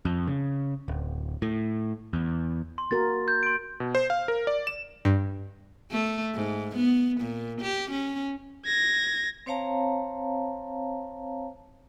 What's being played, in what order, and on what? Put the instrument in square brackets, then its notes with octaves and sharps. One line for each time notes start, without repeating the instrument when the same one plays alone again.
[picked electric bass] F2
C#3
D1
A2
E2
[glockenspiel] C6
[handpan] A#3 F#4 A#4 [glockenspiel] A6
[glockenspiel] G6
C6 D7
[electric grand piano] B2
C5
F5
A#4
D5
E7
[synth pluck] G2
[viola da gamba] A3
G#2
B3
A#2
G4
C#4
[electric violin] G#6 A#6
[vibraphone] C4 C5 C#5 F5 A5 A#5